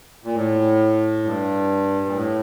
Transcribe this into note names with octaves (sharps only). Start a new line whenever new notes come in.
A#2
A2
G2
A#2
A2